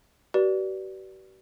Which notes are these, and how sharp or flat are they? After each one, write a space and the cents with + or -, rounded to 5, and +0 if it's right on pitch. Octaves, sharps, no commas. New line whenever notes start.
G4 -45 B4 -25 D5 +0